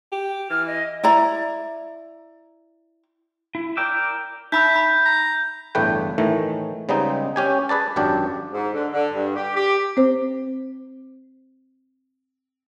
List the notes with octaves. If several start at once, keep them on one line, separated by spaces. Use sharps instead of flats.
G4
E3 F6
D#5
E4 D5 A#5
E4
A#4 D5 G5 D6 E6
D#4 E5 B5 E6 G6
B5
A#5
G1 E2 A2 A3 B4 G5
A2 D#3 E3 A3
C#3 G3 G#3 B3 C4 D#4
C#4 G4 G#5
G#4 B4 D5 A5
G#1 F#2 F#3 D4 G4 A5
G#2
D3
D3
G2
G4
G4
C4 C5